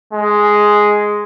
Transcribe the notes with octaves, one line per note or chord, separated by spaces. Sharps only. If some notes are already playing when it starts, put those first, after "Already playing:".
G#3